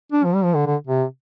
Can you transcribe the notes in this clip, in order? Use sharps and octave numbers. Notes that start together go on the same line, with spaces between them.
D4
F3
G3
F3
D3
D3
C3